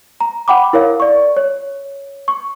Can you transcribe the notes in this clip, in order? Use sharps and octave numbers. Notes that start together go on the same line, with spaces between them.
A#5
F#5 G5 B5 D6
E4 A#4 C#5 F5
D5 C#6
C#5
C#6